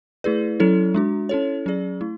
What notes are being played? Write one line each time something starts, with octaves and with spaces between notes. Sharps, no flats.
A3 E4 G#4 B4 D5
F#3 C#4 E4 A4 C#5
G#3 D4 F#4
C#4 E4 A4 C#5
F#3 C#4 G#4 D5
A3 E4